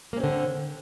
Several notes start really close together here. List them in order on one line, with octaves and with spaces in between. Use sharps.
A#3 C#4 C4 D3